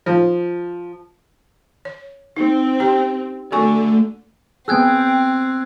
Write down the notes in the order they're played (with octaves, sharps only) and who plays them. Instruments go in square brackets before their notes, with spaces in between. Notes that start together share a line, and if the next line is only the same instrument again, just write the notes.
[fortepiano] F3
[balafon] C#5
[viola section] C4 [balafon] D#4
[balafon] C#4 G4 G5
[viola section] D3 [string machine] A3 [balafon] F#4 G#5 C#6
[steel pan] B3 G#4 [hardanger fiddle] C4 [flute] G5 [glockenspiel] E6 F#6 G#6